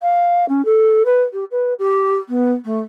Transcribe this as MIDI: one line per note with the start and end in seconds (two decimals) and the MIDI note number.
0.01 0.45 77
0.48 0.64 61
0.65 1.02 69
1.05 1.22 71
1.33 1.44 67
1.51 1.73 71
1.79 2.16 67
2.28 2.52 59
2.64 2.79 57